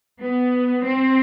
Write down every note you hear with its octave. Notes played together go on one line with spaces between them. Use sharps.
B3
C4